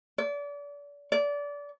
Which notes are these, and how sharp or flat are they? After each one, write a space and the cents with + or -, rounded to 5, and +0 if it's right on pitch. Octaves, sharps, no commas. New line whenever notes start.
D5 -35
D5 -25